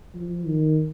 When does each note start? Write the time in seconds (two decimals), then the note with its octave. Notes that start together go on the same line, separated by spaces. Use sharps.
0.15 F3
0.46 D#3